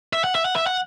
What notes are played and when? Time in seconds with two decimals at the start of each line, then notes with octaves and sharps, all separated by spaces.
0.13 E5
0.24 F#5
0.35 E5
0.45 F#5
0.56 E5
0.67 F#5